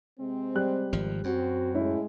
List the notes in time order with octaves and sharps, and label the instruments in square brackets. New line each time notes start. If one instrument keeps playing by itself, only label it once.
[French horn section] C3 G#3 C4
[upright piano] G3 F#6
[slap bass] G#1 F3
[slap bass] F#2 [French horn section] C4 F#4
[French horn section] A2 G#3 [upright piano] C#4 E4